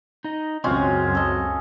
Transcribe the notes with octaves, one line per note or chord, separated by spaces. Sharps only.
D#4 D#5
C#2 F#2 G#3 C4 C#4 F4 F#4
A4 D#5